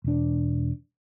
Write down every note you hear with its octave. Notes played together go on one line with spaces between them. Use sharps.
E1 D4